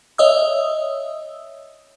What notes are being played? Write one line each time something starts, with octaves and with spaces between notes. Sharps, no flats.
C#5 D#5 E5 D#6 E6